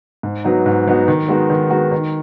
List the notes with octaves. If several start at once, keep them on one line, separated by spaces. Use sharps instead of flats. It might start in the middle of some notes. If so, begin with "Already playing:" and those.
G#2
F#3 B3 D#4 F#4
G#2
F#3 B3 D#4 F#4
D#3
G#3 B3 D#4 F#4
D#3
G#3 B3 D#4 F#4
D#3